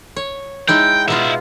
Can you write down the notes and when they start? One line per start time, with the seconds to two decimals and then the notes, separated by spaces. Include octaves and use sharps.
0.16 C#5
0.68 G#3 D#4 E4 G5
1.08 B2 B3 D#4 F4 E5